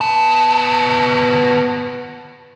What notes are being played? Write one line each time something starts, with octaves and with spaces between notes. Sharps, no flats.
B3 A5